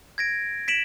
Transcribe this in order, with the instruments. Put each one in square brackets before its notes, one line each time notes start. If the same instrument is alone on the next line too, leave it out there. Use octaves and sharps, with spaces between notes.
[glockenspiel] G#6 A#6 D7
B6 D7 E7 F#7